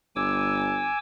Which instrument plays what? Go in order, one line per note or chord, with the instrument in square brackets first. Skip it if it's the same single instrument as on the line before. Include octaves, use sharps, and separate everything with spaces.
[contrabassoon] G1 [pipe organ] G#5 D6 E6